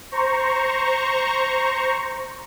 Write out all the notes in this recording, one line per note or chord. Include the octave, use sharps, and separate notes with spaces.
C5 A#5 C#6